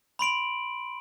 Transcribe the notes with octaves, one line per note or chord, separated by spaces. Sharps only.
B5 C6 D7 F#7